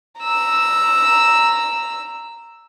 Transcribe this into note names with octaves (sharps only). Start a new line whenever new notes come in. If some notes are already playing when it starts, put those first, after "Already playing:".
A#5 E6